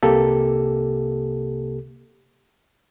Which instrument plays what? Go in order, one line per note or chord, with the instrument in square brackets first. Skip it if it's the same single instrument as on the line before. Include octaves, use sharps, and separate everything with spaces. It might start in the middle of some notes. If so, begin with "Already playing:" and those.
[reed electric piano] C2 C3 A#3 G4 A4